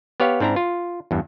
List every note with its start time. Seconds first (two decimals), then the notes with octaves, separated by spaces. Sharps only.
0.20 B3 G4 C#5 F5
0.40 G#2 C4 D4 E4 A#5
0.56 F4
1.11 E2 G2